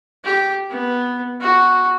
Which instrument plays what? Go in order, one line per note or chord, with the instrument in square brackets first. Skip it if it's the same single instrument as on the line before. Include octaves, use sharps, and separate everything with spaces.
[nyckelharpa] G4
B3
F#4